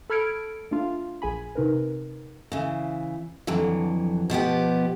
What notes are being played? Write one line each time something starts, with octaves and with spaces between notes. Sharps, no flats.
A4 B5 F6 G#6 C#7 D7
A3 D4 F4
A#1 G#4 G#5 B5
C3 D#4 A#4 B4
C#3 E3
F2 D3 E3 F#3
B2 F3 B3 G4